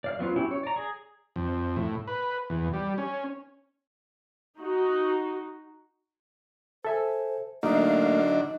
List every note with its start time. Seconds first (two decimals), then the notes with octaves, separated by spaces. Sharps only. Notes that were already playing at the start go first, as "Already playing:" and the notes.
0.04 D5 F5 F6
0.19 F#3 B3 C4 F4
0.36 C#4 E4 F#4 G4
0.51 C#5
0.63 D5 A#5
0.76 G#4
1.36 F2
1.76 A2
2.07 B4
2.50 E2
2.73 G3
2.98 C#4
4.59 D#4 F#4
6.85 A4 C5 E5 G#5
7.63 D3 F#3 A3 A#3 D4 D#4 D#5 F5